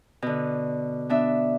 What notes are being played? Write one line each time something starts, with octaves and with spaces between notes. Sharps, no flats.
B2 D3
B3 D4 E5